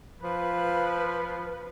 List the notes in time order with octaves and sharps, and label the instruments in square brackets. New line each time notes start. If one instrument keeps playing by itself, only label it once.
[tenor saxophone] F3 [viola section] B4